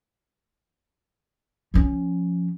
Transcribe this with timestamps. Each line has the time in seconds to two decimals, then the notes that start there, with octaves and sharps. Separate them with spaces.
1.74 F3 C#4